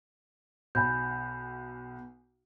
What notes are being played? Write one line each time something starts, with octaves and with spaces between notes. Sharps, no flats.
B1 G#5 B5 G6